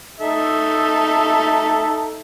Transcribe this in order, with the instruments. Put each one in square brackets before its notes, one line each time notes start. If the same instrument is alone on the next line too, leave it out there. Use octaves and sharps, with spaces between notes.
[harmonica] D#4 A4 E5